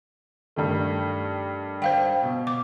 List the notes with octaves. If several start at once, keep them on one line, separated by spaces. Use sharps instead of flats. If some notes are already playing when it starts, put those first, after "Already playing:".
G2 D#3 A3
C5 F5 G5
B2
D6